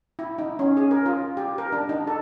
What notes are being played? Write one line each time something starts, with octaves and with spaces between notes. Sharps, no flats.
E4
D#4
C#4
G#4
A#4
F4
G4
A#4
D4
D#4
A4